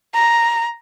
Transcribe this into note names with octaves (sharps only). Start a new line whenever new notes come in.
A#5